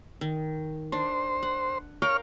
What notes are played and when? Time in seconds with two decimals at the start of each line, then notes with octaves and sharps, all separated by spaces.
0.21 D#3
0.92 D4 C5
1.43 F#5
2.02 A#4 C#5 F5 G5 F6